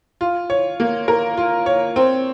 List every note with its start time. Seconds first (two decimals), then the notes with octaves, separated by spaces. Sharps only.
0.21 F4
0.50 C#5
0.80 A#3
1.08 A#4
1.37 F4
1.66 C#5
1.96 C4